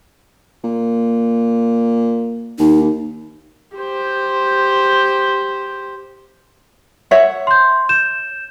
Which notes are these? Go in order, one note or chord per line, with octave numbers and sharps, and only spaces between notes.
A#2
D#2 D#4
G4 C5
C#5 E5 F#5
C6 G6
G6 E7